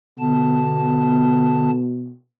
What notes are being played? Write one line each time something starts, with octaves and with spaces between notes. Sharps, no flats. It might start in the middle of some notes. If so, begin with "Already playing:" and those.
B2 D3 B3 A5